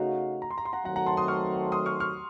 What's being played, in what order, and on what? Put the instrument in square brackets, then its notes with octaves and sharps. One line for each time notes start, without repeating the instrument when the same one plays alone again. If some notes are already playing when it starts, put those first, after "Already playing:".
Already playing: [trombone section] C#3 A3 D#4 F#4 [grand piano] F5
[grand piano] A#5
C6
A#5
C6
F#5 A#5
[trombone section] D#3 F#3 A3 C4 F#4 [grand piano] F#5 A#5
[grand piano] F#5 A#5
A5 C6
C6 D#6
C#6 F6
C6 D#6
C#6 F6
C#6 F6